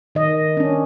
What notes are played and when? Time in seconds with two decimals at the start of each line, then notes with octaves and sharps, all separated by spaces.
0.15 D#3 D#5
0.57 C#4 D4